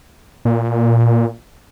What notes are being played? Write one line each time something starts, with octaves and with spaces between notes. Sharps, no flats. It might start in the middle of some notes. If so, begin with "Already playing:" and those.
A#2